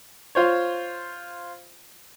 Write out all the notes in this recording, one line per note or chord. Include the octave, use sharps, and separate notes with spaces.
F4 C5 C#5